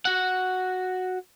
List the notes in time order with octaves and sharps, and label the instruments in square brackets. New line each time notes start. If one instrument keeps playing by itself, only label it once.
[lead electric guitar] F#4 F#5